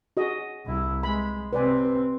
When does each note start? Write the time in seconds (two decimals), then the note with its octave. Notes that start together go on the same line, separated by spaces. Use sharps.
0.17 F#4 G#4 D#5
0.66 C2 E4
1.03 G#3 B5
1.53 C3 C4 B4 D5 G#5
1.85 B4